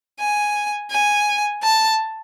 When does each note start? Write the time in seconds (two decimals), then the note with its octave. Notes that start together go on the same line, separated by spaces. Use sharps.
0.19 G#5
0.91 G#5
1.63 A5